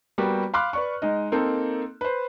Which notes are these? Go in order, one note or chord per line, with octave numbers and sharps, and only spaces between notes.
G3 A#3 B3 F#4 G4
F5 B5 C6 D6 F6 F#6
B4 D5 C#6
G#3 D#4 D#5
A#3 C4 D#4 A4
B4 C5